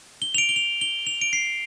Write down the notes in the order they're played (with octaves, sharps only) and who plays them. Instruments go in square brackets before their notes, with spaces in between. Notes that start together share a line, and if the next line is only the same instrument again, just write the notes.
[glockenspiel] G7
F7
D7
G7
F7
G7
F7
D7
C7